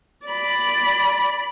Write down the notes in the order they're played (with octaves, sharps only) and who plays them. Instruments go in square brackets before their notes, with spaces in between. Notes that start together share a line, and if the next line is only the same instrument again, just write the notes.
[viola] D5 B5